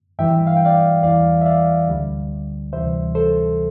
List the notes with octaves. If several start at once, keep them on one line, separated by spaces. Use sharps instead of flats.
G2 E3 G3 E5 G5
F5
G5
D5 F5
E2 E3 G3 D5 F5
E5
D5 F5
D2 D3 G3
D2 C3 E3 G3 C5 E5
A4 C5